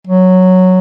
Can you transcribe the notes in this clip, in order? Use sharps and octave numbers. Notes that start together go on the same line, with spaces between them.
F#3